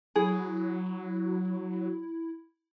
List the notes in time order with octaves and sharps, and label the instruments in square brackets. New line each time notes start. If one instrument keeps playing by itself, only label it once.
[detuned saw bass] F#3 [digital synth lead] E4 [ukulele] G#4